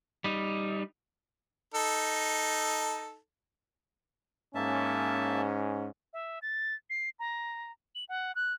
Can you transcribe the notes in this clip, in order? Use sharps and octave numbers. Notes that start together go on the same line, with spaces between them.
G3 D#4
D#4 A4
G#2 A#3 C#4 E5 A5
E5
A6
C7
A#5
F#7
F#5
F#6